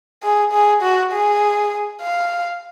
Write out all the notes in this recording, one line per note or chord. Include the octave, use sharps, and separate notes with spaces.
G#4
G#4
F#4
G#4
F5